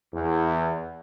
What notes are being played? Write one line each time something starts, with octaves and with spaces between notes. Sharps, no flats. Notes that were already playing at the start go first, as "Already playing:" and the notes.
E2